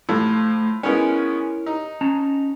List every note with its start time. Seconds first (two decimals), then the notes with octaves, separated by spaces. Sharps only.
0.09 A2 F3 A3
0.83 G#3 B3 C#4 E4 A#4 C#5
1.66 D#4
2.01 C#4 A5 A#5